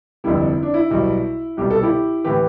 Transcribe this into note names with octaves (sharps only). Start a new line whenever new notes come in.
F1 F2 D3 G3 E4
D4
E4
B1 B2 G3
C2 B2 G3 G4
A4
E4 G4
A2 E3 G4 B4